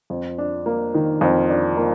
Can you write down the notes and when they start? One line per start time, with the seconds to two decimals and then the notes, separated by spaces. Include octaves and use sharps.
0.10 F2
0.38 D4
0.66 A#3
0.94 D#3
1.21 F2
1.50 D4
1.77 A#3